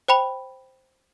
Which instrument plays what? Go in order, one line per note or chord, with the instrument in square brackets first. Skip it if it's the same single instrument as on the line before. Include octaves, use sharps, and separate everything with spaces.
[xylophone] C5 G5 B5 F7